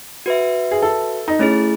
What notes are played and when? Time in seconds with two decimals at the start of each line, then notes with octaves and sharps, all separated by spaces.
0.26 F#4 B4 E5
0.71 G#4
0.82 A4
1.28 D#4
1.39 A3 C#4 E4 G#4